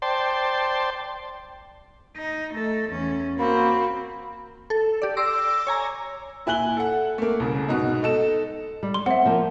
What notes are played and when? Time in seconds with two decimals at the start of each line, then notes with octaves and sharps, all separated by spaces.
0.02 C5 D5 G5 A5 C6
2.17 D#4
2.55 A3 A4
2.90 E2 C#4
3.38 A#3 C4 F#4 B5
4.70 A4
5.02 G4 D5
5.17 C6 D6 E6 A#6
5.67 C#5 G#5 A#5
6.46 A#2 E4 G#5 F#6 F#7 G7
6.77 A4 F#5
7.18 A3 A#3
7.40 C2 C#3
7.68 G#2 B2 F#4
8.03 D#4 A4 E7
8.83 G3
8.94 C6
9.06 C4 E5 F#5
9.26 F3 A#3